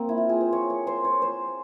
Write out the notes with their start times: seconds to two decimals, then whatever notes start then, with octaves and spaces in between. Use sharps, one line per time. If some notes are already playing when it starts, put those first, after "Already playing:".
Already playing: A#3 C4
0.09 E4
0.18 F4
0.29 G#4
0.41 C5
0.53 C#5
0.70 C#5
0.87 C5
1.05 C#5
1.22 C5